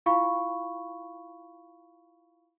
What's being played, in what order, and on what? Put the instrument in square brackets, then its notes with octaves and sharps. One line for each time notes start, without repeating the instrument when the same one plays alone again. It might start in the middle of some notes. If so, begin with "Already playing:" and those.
[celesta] E4 F4 F5 B5 C#6